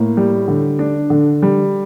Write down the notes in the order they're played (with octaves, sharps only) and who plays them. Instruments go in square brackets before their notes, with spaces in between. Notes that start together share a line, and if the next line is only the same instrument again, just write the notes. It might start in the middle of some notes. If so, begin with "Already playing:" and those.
Already playing: [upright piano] A2 A#3
G3
D3
D4
D3
G3